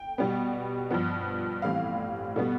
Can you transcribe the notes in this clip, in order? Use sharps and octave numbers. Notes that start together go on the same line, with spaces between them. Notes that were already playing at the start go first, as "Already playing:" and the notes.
Already playing: G5
B2 G3 B3
G2 F3 B3
A2 E3 G3 C4 F5
B2 G3 B3 A4